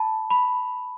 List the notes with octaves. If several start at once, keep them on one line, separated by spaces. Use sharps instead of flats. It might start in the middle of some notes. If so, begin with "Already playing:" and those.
Already playing: A5 B5
B5